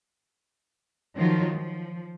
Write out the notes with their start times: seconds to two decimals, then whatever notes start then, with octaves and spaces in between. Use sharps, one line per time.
1.16 D#3 F3 F#3 F4
1.54 F3